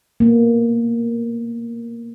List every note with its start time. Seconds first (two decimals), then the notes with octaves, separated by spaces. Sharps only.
0.20 A#3 B3